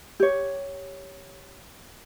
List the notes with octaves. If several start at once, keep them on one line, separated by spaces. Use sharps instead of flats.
G4 C#5